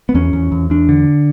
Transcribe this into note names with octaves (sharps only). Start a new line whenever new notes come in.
B3
E2 C#4
E2
E2
E2 D4
D3